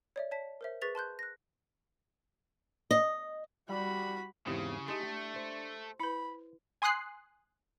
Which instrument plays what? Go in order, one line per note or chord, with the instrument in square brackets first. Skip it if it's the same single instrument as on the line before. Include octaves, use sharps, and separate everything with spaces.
[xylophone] C#5 D5 E5
C#5 A5 B6
A#4 C5 E5
G#4 B4 C#6 A6 B6 F7
A5 C6 F#6 G6
F#6 A#6
[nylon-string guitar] D#5
[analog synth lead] G3 [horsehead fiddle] F#4 B5
[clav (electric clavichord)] E2 G#2 C4 [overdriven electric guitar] C#3 [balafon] E4 G4
[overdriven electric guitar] A3 [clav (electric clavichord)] D#4 G#4 [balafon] G4 C6
[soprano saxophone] D4 [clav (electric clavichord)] G5
[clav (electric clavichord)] C5
[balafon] E4 B4 [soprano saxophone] B5
[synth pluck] G#5 C6 D#6 F#6 C7